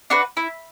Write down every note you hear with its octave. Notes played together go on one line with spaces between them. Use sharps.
D4 F#4 B4
E4